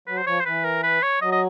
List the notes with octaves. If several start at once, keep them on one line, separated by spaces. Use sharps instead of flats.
F#3 B4
C5
F3 C#5
C5
E3 B4
A#4
B4
C#5
F#3 D#5
D#5